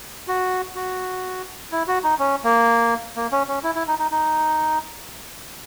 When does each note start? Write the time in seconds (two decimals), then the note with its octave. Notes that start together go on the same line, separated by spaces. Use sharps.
0.28 F#4
0.75 F#4
1.72 E4
1.87 F#4
2.04 D#4
2.19 C#4
2.44 A#3
3.16 A#3
3.32 C#4
3.48 C#4
3.64 E4
3.75 E4
3.88 D#4
3.99 D#4
4.11 D#4